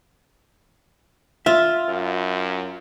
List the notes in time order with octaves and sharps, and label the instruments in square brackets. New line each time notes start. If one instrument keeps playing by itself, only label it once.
[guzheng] F4 [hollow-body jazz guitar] E5
[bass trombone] F#2